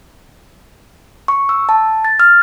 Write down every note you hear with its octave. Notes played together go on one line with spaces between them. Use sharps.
C#6
E6
A5
A6
F6